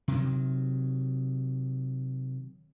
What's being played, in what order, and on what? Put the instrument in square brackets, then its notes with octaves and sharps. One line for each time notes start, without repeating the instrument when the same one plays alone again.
[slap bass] C3 D#3 F#3